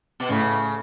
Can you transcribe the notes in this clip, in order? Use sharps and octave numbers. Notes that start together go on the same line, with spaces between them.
B2
A2 C#3